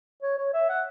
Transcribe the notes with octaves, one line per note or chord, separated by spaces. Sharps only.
C#5
C#5
E5
F#5